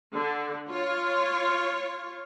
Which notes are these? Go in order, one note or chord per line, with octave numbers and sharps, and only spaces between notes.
D3
F4 C#5